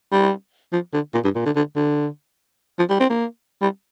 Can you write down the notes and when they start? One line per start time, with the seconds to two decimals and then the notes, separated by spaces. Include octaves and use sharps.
0.12 G3
0.73 F3
0.94 D3
1.14 A#2
1.24 G2
1.36 A#2
1.46 D3
1.56 D3
1.76 D3
2.79 F3
2.90 G3
3.00 C4
3.10 A#3
3.62 G3